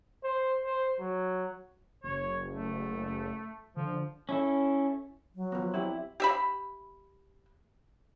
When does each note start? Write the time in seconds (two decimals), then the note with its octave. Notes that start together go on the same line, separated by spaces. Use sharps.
0.24 C5
0.65 C5
1.00 F#3
2.04 F#1 C#5
2.53 A3
3.77 D3 F3
4.29 C#4 E4 A4
5.35 F#3
5.52 F3 B3
5.74 G3 C4 E4 G4
6.20 G4 E5 B5